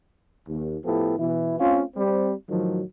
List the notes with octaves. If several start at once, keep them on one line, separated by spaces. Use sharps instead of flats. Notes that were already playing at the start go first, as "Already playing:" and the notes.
D#2
A2 F3 B3 E4 G4 A4
B2 E3 E4
A3 C4 C#4 F4
G3 C4
A2 D#3 F3 F#3